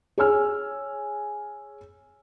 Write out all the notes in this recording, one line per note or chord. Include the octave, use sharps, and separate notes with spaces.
G#4 C#5 G#5 E6 F6